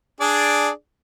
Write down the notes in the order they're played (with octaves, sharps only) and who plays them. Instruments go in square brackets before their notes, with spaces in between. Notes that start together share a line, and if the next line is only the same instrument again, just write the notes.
[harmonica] D4 G#4 D5